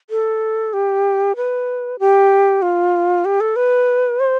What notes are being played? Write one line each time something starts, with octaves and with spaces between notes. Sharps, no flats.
A4
G4
B4
G4
F4
G4
A4
B4
C5